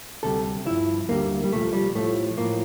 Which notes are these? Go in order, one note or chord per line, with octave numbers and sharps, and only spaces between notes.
D2 C3 G3 A4
G2 F3 E4
D2 D3 G3 A#3
G3
C2 A#2 F3 A3
G3
A2 F3 A3
A2 F3 A#3